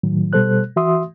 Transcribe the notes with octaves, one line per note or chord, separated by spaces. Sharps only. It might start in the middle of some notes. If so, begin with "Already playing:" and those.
A2 D#3 F#3
B2 G3 A4 C5 F#6
E3 F#4 E5 C6 D#6